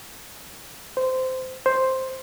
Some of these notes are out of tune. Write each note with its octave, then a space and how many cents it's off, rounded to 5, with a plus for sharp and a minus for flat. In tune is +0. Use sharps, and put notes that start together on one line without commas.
C5 -15
C5 +5